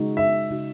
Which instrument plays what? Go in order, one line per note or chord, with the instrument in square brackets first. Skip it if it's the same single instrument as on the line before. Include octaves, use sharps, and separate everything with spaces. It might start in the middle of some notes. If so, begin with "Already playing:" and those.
Already playing: [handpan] C#3 G#3 D#4 F#4
[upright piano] E5
[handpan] C#3 G#3 D#4 F#4